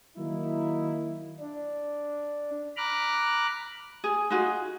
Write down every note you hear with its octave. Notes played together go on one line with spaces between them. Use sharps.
D#3 F#3 A#3 D#4 E4
D4
A#5 B5 D6 F6 F#6
G#4
D#4 F4 F#4 G#4